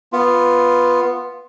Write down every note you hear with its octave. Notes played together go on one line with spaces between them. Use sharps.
B3 F4